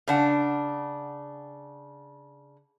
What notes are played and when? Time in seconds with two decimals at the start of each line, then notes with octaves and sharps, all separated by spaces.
0.08 C#3 D4 F#5